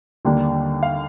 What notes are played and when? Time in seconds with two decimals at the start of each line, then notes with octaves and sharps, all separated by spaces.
0.25 D#2 D3 G3 A#3 D4
0.83 F5